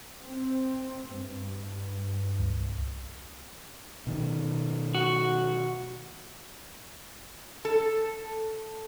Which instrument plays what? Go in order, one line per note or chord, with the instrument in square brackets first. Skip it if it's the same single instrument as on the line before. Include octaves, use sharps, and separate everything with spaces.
[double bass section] C4
G2
[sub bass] C2
[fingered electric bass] B2 D#3
[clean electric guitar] F#4
[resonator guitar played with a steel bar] A4